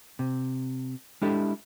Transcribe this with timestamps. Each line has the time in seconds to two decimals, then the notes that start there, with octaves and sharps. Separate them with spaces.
0.19 C3
1.22 G#3 D4 E4 G4 A4